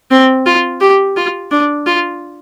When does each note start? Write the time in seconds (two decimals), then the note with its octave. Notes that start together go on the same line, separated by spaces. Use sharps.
0.11 C4
0.46 F4
0.81 G4
1.16 F4
1.51 D4
1.86 F4